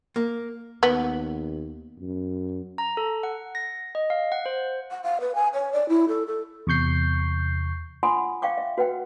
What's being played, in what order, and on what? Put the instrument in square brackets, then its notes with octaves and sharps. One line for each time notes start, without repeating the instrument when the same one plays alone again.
[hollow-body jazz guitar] A#3
[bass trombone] D#2 [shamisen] B3
[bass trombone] F#2
[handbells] A#5
A4
F#5
A#6
D#5
F5
F#5
C5
[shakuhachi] F#5
F5
B4
G#5
C#5
D5
E4
A4
A4
[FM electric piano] E2 C3 C#6 G6 C7
[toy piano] F4 F#5 G#5 B5 C6 D#6
F5 G5 C#6 D6
E5
F#4 B4 F#5 G5